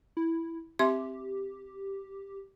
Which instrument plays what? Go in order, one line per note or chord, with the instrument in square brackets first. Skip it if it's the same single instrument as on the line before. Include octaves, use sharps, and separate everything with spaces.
[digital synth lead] E4
[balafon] C4 E5 C6 [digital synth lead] G4